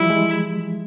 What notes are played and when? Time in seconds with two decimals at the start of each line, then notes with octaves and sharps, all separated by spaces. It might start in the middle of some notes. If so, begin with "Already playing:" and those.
Already playing: E3 F3 G3 E4
0.10 G#3